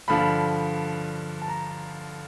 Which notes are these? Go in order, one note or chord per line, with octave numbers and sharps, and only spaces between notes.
G2 D3 F3 B5
A5
A#5